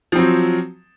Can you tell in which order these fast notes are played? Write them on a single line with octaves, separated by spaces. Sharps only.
F3 C4 F#3